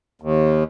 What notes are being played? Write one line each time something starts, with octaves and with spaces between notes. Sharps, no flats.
D#2